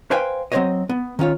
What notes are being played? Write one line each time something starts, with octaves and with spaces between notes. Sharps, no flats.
B4 C5 F5 G5 G#5
F#3 C4 G4 C5 C#5 D#5
B3
D#3 C#4 F4 C#5